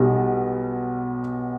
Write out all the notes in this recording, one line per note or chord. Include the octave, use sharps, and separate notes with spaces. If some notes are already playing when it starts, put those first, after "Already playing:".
Already playing: B1 B2 G3